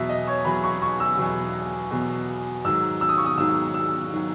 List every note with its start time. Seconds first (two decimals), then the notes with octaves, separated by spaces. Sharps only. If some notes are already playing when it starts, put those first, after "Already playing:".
Already playing: E2 B2 F#3 E5
0.09 D#5
0.28 C#5
0.45 E2 B2 F#3 B5
0.64 C#6
0.82 C#6
1.00 E6
1.18 E2 B2 F#3
1.91 E2 B2 F#3
2.64 G#2 D#3 F#3 E6
3.01 E6
3.09 D#6
3.18 C#6
3.26 D#6
3.38 G#2 D#3 F#3 E6
3.74 E6
4.12 D#3 F#3